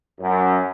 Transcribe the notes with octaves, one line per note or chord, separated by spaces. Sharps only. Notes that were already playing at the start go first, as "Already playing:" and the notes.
F#2